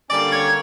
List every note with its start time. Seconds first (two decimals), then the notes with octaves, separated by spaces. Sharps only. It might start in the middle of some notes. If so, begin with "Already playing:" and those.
0.09 D3 G3 A#3 C#4 D5
0.30 C#5